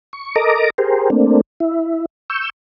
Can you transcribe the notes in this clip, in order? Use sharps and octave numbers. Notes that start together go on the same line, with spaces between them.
C#6
A4 A#4 D#5 A#5 D6
G4 G#4 A#4 C5
A3 A#3 C4 D4
E4
C#6 E6 G6